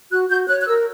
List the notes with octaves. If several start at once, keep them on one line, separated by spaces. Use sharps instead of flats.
F#4 F#6
F#4 G6
C#5 F#6
F#6
A#4 E6